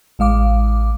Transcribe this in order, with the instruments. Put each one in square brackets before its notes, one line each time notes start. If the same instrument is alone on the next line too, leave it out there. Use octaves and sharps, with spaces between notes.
[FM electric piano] A1 G#3 F5 D6